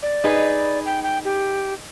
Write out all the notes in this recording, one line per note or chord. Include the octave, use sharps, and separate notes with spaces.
D5
D#4 G#4 B4
G5
G5
G4